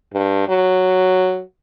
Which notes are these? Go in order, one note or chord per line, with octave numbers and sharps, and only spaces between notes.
G2
F#3